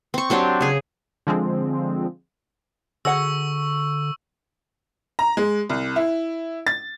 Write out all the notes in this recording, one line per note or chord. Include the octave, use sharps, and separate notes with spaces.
C4 C#6
F#3 C4 D4 G4
C#3 G#4
D3 F3 G#3 C4
D3 F#4 G#4 F#5 C#6 E6
A#5
G#3
C2
E4
A6